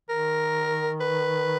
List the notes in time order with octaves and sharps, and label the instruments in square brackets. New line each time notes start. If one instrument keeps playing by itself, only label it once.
[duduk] D#3 [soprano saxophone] A#4
[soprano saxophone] B4